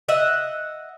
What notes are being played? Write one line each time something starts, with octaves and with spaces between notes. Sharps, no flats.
D#5 E5 F#5